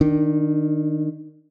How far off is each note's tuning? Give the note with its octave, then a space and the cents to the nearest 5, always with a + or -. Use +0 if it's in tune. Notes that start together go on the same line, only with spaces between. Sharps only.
D#3 -10 D4 +15